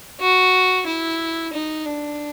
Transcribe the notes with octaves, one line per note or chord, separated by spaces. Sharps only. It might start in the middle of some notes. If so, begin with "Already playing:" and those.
F#4
E4
D#4
D4